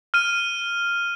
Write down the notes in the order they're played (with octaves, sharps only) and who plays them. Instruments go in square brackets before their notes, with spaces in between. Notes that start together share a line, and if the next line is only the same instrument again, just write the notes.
[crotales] F6 D#7